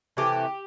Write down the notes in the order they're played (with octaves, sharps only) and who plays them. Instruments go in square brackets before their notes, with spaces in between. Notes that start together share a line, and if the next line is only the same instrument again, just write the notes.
[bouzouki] C3 E3 A3 G4